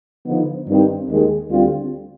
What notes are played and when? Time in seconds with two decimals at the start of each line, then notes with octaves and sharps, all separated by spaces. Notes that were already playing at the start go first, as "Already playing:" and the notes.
0.26 D3 F3 B3 D#4
0.67 G2 D#3 G3 C4 D#4
1.09 D#2 D#3 G#3
1.50 D2 D3 G3 C4 F4